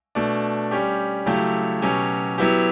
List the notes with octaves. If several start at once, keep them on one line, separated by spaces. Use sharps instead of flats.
B2 A3 D4
G3 C#4 G4
C#3 F#3 A3 E4 G4
B2 F#3 C#4 G4
F#3 B3 E4 G4